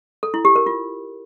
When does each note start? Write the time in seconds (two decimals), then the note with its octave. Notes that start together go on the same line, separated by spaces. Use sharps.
0.23 A4
0.34 E4
0.45 G4
0.56 A#4
0.66 F4